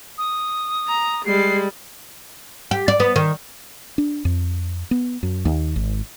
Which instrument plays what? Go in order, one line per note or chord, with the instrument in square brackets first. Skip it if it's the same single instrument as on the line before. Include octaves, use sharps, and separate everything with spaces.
[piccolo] D#6
[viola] A#5
[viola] G3 G#3 [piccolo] C7
[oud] G4
D5
B3
D#3
[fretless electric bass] D4
F2
B3
F#2
D#2
G#1